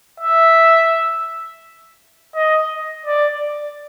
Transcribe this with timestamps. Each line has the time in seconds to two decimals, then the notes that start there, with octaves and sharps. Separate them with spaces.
0.20 E5
2.35 D#5
3.06 D5